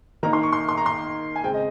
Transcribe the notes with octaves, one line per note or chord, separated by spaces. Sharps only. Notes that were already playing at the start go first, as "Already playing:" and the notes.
D#3 A#3 D#4 A#5
C6
C#6
C6
C6
A#5
C6
G#5
C#3 G#3 C4 G5
D#5